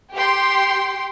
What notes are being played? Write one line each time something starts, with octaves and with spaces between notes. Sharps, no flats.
G4 G5 C6